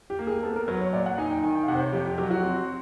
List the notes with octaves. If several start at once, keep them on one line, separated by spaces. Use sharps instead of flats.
G4
A#3
G#4
B3 A4
A#4
F#3 B4
C#5
A#2 D5
F#5
D#4 G#5
G5
D#3 G#5
G5
F5
C3 F#5
C5
C#5
F2 G4
G4
F#3 G4
F#4
C4